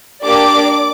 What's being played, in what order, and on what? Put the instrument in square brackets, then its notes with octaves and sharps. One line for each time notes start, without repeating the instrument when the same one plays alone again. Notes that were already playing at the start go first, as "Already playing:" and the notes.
[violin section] A#3 D4 G4 D5 D6